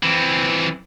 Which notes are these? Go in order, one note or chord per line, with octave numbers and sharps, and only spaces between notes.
E3 C4